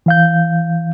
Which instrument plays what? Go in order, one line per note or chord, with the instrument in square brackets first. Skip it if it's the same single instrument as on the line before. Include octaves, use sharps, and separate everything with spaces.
[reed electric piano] E3 F5 G6